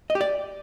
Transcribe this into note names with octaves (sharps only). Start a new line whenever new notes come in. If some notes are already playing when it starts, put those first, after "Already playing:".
D#5
G4
D5